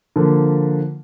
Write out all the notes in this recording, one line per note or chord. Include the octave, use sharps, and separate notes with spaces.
D3 F3 A#3